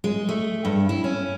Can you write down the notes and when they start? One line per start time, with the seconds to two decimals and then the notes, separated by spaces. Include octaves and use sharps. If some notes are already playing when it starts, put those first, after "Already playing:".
0.04 G#3
0.29 A3
0.65 G2
0.89 E4
1.04 C#4